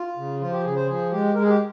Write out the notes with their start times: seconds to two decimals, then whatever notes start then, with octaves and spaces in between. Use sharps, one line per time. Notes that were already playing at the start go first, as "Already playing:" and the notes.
Already playing: F4
0.17 C#3
0.40 F3 F4
0.52 G4
0.64 C#3 G#4
0.76 C5
0.87 F3 G#4
1.11 G#3 G4
1.34 G#3 A#4
1.42 G#4
1.49 G4